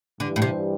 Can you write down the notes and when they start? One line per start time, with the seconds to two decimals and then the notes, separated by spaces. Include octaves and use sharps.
0.20 G2 D3 E3 G3
0.36 A2
0.42 C3